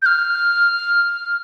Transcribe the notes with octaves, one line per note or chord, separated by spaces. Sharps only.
G6
F6